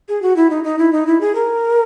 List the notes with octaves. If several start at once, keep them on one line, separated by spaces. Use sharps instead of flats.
G#4
F#4
E4
D#4
D#4
E4
D#4
E4
G#4
A#4